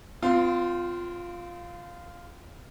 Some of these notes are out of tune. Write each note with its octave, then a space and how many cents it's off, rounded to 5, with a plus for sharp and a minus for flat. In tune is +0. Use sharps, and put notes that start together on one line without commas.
C4 -35 F4 +0